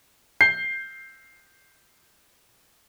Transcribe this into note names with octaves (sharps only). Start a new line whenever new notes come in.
G6 C7